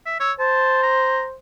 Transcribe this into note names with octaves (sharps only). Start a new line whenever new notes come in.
E5
C#5 E6
C5 A5
A#5